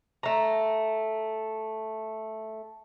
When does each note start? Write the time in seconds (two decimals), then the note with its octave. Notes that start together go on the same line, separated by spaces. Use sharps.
0.23 A3 A#5